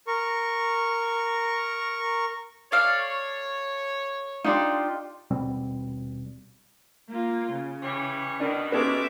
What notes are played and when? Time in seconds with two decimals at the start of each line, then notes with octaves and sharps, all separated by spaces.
0.07 A#4 C#6
2.72 A4 C#5 D5 F5
4.44 D4 D#4 F4 G4 C6
5.31 D#1 B2 G3 C4
7.10 A#3 F4
7.52 C#3
7.83 E3 G3 C#5
8.40 B2 D#3 D4
8.72 G3 G#3 B3 C#4 F#4 A4 E5 D6